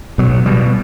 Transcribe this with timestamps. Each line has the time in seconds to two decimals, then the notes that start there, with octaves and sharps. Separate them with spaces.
0.18 B2 F#3
0.46 B2 G3